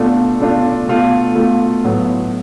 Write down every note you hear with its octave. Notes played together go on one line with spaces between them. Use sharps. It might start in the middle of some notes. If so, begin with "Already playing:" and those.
Already playing: B2 A3 D4 F4
B2 A3 D4 F4
B2 A3 F4
B2 A3 F4
A2 F#3 B3